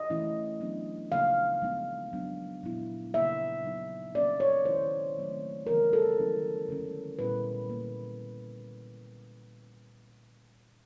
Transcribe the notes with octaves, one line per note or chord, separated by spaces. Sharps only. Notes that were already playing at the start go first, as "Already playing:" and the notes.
Already playing: D#5
E3 A3 C#4 E4
F#3 B3 D4
C#3 F3 A#3 F5
F3 G#3 B3 D#4
F#3 B3 D4
A#2 F#3 B3 E4
C#3 F3 A#3 D#4 E5
F#3 B3 D#4
F3 A#3 C#4 D5
C#5
D#3 G#3 C#4 E4 C5
D#3 F#3 A3 C4
C#3 E3 G3 B3 A#4
A4
D#3 F#3 A#3 C#4 E4
D3 F3 G#3 C#4
A#2 G3 B3 E4 B4
A#3